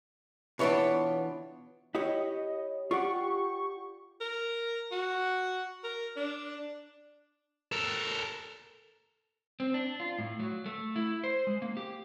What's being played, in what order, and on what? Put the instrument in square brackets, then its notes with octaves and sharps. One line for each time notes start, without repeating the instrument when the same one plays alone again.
[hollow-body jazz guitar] B2 E3 D4 [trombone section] B3 [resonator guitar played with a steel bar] F4 C#5
[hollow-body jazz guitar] E4 G4 C#5 [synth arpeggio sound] D#5
[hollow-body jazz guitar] F4 D5 F#5 [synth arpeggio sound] G4 C#6
[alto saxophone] A#4
F#4
A#4
D4
[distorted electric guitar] A4 A#4
[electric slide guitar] C4
D4
F4
A2
F#3
A3
E4
C5
G#3
A#3
G4